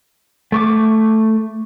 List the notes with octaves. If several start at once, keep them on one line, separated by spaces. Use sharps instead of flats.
A3 C#6 D6